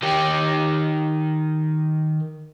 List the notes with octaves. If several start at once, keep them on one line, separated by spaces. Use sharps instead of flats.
D#3 G4